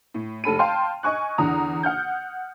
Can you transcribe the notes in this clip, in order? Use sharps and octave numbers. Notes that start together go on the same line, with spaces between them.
A2
F1 A4 B5 D#7
F5 G5 A5 C6 F6
D#5 G#5 C#6 F#6
E2 D3 A#5 D#6
F#5 F6 G6